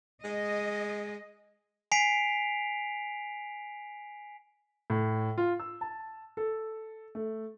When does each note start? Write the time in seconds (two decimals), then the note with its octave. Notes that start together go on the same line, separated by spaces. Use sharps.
0.24 G#3 D#5
1.92 G#5 B6 C7 D7 F7
4.90 A2
5.38 F4
5.60 E6
5.81 A5
6.37 A4
7.15 A3